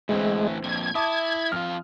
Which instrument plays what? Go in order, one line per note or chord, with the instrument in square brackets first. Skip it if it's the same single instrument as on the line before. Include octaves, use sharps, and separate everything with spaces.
[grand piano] D2 C4 [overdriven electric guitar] A2 E3 [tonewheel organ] G#3
[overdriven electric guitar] F2 A#2 [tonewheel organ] G#6
[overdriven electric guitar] E4 [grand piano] A5 D6 D#6
[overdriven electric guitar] F2 F4 [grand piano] F6